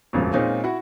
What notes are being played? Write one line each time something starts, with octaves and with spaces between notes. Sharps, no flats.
E1 A1 F2 C#3
A#2 G#3 C4 C#4 D#4 F4
E4 F#4 F#5